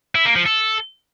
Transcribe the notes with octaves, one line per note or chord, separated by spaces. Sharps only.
E4
A#3
F3
A4